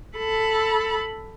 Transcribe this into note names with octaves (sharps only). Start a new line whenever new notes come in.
A4 B5